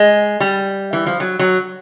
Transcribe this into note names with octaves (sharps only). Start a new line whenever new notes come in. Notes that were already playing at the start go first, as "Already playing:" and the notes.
Already playing: G#3
G3
E3
F3
F#3
F#3